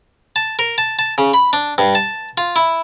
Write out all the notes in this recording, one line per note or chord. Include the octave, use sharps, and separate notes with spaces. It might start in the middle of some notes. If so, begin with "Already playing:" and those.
A5
A#4
A5
A5
C#3
B5
D4
G2
A5
F4
E4